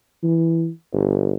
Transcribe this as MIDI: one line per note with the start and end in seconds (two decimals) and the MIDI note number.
0.23 0.69 52
0.93 1.36 31